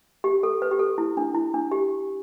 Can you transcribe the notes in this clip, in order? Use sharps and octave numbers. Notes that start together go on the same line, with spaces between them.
G4
A4
B4
G4
A4
E4
D4
E4
D4
G4